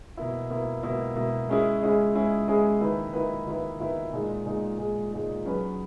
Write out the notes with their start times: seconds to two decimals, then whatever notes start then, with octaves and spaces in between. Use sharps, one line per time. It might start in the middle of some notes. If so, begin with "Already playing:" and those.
0.17 B2 A#3 E4
0.50 B2 A#3 E4
0.83 B2 A#3 E4
1.16 B2 A#3 E4
1.49 G#3 C#4 E4 G#4
1.82 G#3 C#4 E4 G#4
2.15 G#3 C#4 E4 G#4
2.48 G#3 C#4 E4 G#4
2.81 D#3 A#3 E4 B4
3.13 D#3 A#3 E4 B4
3.47 D#3 A#3 E4 B4
3.80 D#3 A#3 E4 B4
4.13 A#2 G#3 D#4 G#4
4.46 A#2 G#3 D#4 G#4
4.78 A#2 G#3 D#4 G#4
5.12 A#2 G#3 D#4 G#4
5.45 F#3 C#4 G#4 B4